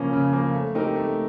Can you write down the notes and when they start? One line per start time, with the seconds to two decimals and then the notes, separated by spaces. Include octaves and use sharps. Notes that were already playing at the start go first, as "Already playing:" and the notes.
Already playing: C#3 F3 A#3 C#4
0.13 C#3
0.33 F3 A#3 C#4
0.54 A3
0.75 C4 D#4 G4 A#4
0.96 A3